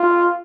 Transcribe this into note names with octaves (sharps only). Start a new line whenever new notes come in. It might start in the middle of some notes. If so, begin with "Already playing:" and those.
Already playing: F4